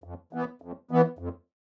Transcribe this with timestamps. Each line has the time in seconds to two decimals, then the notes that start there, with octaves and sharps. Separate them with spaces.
0.04 F2
0.33 E3 B3
0.62 F2
0.91 E3 B3
1.19 F2